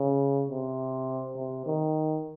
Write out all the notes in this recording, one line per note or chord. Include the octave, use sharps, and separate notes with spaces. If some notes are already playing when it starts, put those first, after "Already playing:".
Already playing: C#3
C3
C3
D#3